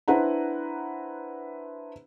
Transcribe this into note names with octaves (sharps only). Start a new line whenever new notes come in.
D4 E4 B4 C5 F#5 A#5